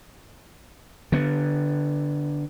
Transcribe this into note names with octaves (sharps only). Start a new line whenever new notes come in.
D3 B3